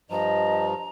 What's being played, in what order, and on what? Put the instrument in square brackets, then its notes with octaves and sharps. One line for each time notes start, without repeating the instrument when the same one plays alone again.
[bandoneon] G2 F3 [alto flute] D#5 [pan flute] A#5